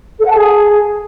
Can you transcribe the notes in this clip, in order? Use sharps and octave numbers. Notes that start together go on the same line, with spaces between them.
A4
F#5
A5
G#4